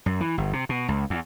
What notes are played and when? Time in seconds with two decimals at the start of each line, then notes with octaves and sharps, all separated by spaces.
0.06 F#2
0.21 E3
0.38 G1
0.53 C3
0.69 B2
0.88 C#2
1.10 E2